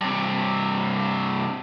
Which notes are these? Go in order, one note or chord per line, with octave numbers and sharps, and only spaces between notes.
G2 C3